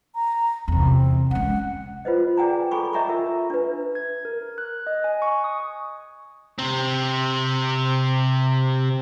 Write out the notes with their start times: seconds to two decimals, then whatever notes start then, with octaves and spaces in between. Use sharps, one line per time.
0.15 A#5
0.68 E2 C3 C4
1.31 G#3 C#4 F#5
2.05 F4 B4 C5 D#5
2.37 G#4 D5 G5 G#5 A#5
2.71 G#4 A4 G#5 B5 C#6
2.93 C#5 D#5 E5 A#5 B5 C#6
3.08 F4 A#4 E5
3.50 D4 B4
3.95 G#6
4.25 A#4
4.58 F#6
4.87 D#5
5.04 G#5
5.22 C#6
5.44 D#6
6.59 C3 C4